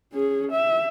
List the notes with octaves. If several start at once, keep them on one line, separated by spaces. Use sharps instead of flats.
C#4 G#4
E5